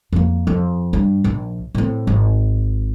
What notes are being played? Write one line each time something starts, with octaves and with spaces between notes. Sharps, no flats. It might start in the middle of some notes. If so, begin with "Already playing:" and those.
F2 A#3
F2
G2
A#1
A2 C4
G#1